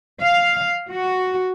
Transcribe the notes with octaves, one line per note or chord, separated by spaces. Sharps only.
F5
F#4